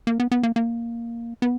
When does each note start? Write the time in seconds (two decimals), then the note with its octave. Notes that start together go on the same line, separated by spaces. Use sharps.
0.07 A#3
0.20 B3
0.32 B3
0.43 A#3
0.56 A#3
1.42 B3